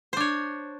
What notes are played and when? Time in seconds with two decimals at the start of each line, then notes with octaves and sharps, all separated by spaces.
0.13 C5
0.17 D4
0.20 C#5